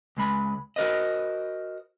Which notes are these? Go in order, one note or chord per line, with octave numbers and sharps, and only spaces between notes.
C#2 G#3 B5
F#4 A#4 C5 D#5